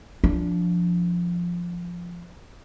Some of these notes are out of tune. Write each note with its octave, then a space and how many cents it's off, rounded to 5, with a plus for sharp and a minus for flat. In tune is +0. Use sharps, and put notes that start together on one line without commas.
F3 +0 D4 -15